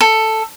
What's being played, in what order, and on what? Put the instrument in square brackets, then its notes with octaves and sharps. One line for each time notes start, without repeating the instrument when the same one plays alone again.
[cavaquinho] A4